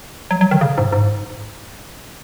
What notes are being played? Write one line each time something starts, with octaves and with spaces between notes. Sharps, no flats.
F#3
F#3
D#3
C#3
G#2
G#2